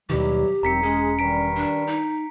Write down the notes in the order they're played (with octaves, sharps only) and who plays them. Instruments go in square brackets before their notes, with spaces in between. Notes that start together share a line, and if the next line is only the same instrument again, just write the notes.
[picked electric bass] D#2 B2 D#3 [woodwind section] E3 F#3 G3 [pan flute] G4
[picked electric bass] E1 [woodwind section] D#3 F#3 C4 [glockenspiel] A#5 B6 C#7
[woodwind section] G#3 G#4 [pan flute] C#4
[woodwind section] G2 D#3 G3 [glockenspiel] A#5 B6 D7
[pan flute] D4
D#4